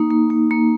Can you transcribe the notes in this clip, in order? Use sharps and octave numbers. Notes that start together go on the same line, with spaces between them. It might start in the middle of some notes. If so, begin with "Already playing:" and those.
Already playing: A#3 D#4
A#3
A#3
A#3